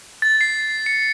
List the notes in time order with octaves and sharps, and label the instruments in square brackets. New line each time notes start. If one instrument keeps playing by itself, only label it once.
[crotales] A6
C7
C#7